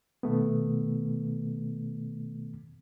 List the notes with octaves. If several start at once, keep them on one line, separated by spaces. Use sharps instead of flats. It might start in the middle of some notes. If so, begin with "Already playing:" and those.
B2 D#3 A3 B3